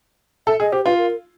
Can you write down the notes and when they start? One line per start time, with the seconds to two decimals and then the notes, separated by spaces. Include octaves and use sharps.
0.47 A4 E5
0.60 G#4 D#5
0.72 G4 C5
0.85 F4 B4
0.98 A#4